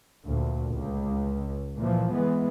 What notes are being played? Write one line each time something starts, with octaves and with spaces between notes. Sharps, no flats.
D2 A#2
C#2
A#2 E3 F3
E3 G#3 B3